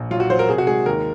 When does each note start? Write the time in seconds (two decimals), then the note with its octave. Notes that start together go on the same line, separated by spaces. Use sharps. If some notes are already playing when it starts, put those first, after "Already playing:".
Already playing: A#1
0.11 F#3 F4
0.20 F#4
0.29 F#3 C5
0.39 A#4
0.49 C3 G#4
0.58 F#4
0.67 G#3 G#4
0.86 D#2 A#4